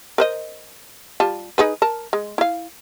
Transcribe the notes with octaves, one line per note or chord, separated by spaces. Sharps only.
A#4 C5 D#5
G3 F4 A5
D#4 G#4 B4
A#4 A5
G#3
E4 F5